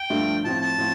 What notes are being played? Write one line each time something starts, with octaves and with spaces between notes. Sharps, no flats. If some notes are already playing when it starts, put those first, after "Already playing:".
Already playing: G5
G2 F3 A3
A2 F3 C4 A5
A5
A2 F3 C4